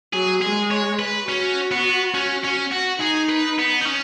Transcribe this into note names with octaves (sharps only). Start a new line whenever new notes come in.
F#3 G#4
G#3 G#4
C#5
B4
C#4 F#4
B3
C#4
C#4
F#4
D#4 G#4
B4
B3
D#4
C#4